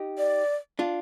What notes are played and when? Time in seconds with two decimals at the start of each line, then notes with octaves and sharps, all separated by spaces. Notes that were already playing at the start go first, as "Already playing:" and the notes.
Already playing: D#4 G4
0.18 D5
0.79 D4 F4